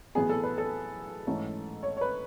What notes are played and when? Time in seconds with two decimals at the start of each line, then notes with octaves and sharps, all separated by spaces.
0.15 B1 A2 E3 B3 G#4
0.29 A4
0.43 B4
0.58 A4
1.27 G#2 E3 A3 C#4
1.83 C#5
1.97 C#5
2.01 B4